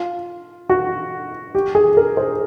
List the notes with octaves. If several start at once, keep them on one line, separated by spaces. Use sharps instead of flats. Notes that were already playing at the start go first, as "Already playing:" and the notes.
Already playing: F4
F#4
G4
G#4
A#4
C5